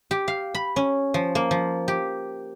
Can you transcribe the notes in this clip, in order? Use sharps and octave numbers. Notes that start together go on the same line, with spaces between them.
G4
F5
B5
C#4
F3
A#3
F3
G4